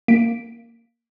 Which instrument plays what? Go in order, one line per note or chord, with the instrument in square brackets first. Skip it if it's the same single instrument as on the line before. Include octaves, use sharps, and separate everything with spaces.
[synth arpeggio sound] A#3 B6 D7